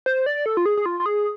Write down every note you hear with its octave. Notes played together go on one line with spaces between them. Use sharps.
C5
D5
A4
F4
G#4
G#4
F4
F4
G#4